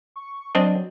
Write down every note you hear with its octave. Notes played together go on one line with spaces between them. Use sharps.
C#6
F#3 C4 D4 D#5